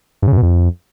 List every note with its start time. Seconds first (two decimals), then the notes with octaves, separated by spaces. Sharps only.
0.22 G2
0.27 C#3
0.32 F#2
0.37 B2
0.42 F2